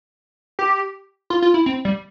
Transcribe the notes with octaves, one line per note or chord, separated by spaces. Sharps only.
G4
F4
F4
E4
C4
G3